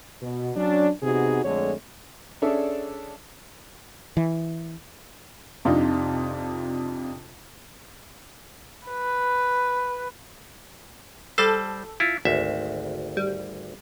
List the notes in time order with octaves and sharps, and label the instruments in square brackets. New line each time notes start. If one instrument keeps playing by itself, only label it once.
[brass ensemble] B2
F#3 C#4 D4
C3 B3 D#4 F#4 G#4
F2 D3 G#3 A3 C#5
[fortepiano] C#4 D4 G#4 A4 D5 E5
[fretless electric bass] E3
[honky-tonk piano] F2 C3 D4 D#4 F4
[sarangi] B4
[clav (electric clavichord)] G3 C5 [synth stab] A4
[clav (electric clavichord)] E4 F4
G#1 D2 E5
[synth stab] G3